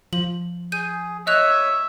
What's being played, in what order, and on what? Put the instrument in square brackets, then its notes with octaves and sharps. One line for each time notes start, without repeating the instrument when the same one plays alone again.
[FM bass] F3 [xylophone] F#7
[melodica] G#4 [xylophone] G6 D#7
[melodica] C#5 D#6 [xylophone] D#5 F#6 F7 [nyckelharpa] E5